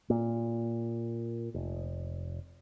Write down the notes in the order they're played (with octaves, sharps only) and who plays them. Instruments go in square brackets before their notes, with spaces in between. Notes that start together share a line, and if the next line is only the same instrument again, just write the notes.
[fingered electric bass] A#2
F1